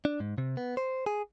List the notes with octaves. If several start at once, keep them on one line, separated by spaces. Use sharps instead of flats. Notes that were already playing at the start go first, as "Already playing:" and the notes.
D4
G#2
C3
B3
C5
G#4